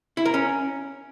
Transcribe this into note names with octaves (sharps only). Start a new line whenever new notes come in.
E4
A#4
C#4